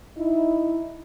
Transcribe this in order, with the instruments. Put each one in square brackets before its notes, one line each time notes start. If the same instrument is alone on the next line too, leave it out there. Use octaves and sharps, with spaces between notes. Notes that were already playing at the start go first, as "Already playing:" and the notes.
[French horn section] D#4 E4